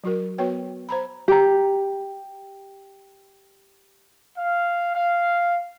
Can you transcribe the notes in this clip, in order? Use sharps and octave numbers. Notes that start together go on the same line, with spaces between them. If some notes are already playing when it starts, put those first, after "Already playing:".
F#3 F#4 A#4
B3 F#4 B4 C#5 G5
C5 A#5 B5
G4 A#5
F5
F5